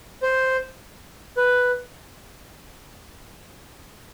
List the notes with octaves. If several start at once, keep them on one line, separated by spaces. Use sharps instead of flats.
C5
B4